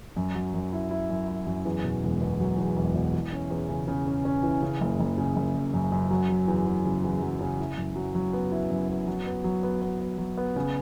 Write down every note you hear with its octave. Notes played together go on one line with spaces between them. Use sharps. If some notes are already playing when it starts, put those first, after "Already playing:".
F#2
F#3
F#2
E4
E4
F#2
E4
F#2
E2
B2
E1
B2
F#3
E2
E1
B2
E3
C#4
E2
C#3
C#3
C#4
C#4
E3
C#3
F#1
F#1
C#3
F#1
F#2
F#2
F#2
F#3
F#3
E2
E2
C#3
E2
F#3
C#3
E4
F#2
F#3
F#3
B3
E4
F#2
B3
F#3
B3
F#3
B3
B3
B3
F#3
B3
C#3